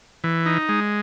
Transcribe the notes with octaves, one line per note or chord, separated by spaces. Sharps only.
E3
D#4
G#3